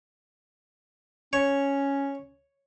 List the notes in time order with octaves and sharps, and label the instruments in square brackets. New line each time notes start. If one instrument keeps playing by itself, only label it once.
[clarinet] C#4 [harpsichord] C#5